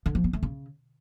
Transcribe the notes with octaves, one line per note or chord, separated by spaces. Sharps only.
D3
F3
B3
A3
C#3